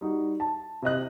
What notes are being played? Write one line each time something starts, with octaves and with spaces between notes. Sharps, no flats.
G3 D#4 F#4
A5
C3 E4 D#5 F#6